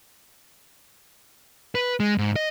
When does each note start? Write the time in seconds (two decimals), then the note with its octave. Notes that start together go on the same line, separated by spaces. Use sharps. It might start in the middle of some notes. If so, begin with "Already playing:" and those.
1.75 B4
2.00 G#3
2.18 G#2
2.36 D#5